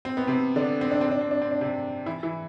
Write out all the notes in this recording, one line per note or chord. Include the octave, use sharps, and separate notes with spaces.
C4
B3
C3 C4
D3 D4
C4
D4
C4
D4
C4
D4
C4
D4
C3 C4
E3 E4
E3 E4